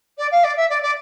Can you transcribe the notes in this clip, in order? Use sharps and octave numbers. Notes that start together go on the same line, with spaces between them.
D5
F5
D5
E5
D5
D5